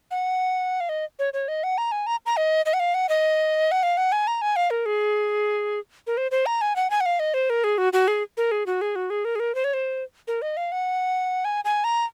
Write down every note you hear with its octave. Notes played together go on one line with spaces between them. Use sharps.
F#5
F5
D#5
C#5
C#5
D#5
F#5
A#5
G#5
A#5
A#5
D#5
D#5
F#5
F5
F#5
D#5
F#5
F5
F#5
G#5
A#5
G#5
F5
A#4
G#4
A#4
C5
C5
A#5
G#5
F#5
G#5
F#5
F5
D#5
C5
A#4
G#4
F#4
F#4
G#4
A#4
G#4
F#4
G#4
F#4
G#4
A#4
G#4
A#4
C5
C#5
C5
A#4
D#5
F5
F#5
G#5
G#5
A#5